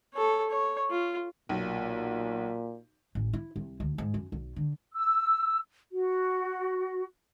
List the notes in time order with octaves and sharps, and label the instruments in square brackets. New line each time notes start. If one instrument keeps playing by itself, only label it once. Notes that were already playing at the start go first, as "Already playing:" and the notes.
[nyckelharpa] A4 C#5
C#5
F4
[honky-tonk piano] B1 [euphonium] A#2
[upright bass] A1
E4
C2
D2
G#2
F#2
B1
D3
[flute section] E6
F#4